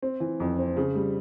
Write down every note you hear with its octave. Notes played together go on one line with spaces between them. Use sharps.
C4
E3
F2
C4
C#3
G3